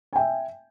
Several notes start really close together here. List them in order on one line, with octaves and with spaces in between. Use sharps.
G#5 G5 E5